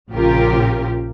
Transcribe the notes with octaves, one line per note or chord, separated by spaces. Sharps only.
A#1 C#3 F4 G4 A#4